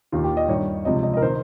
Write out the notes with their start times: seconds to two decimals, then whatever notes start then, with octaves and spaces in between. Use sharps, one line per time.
0.12 D#2 D#3 F4
0.24 G4
0.37 D#5
0.48 G2 D#3 C#5
0.85 C#2 C3 F3 D#5
1.03 D#5
1.13 D#5
1.17 A#4
1.22 D#3 C5